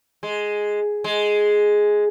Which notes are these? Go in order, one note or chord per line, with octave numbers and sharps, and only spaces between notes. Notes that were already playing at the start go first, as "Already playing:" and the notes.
G#3
G#3